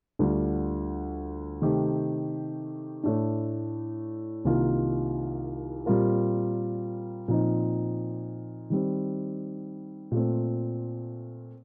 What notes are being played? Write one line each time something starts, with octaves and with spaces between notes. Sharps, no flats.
D2 D3 G3 D4 F4
C3 D#3 A3 C4 G4
A2 A3 D4
C2 C3 D#3 A#3 F4
A#2 G3 C4 F4 A#4
A#2 F3 C4 D#4
D#3 G3 C4
A#2 A3 C4